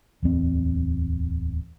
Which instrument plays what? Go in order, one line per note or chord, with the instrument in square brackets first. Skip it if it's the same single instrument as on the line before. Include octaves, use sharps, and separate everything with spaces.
[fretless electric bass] D1 E2 C4